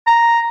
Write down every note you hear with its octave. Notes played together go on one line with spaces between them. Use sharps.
A#5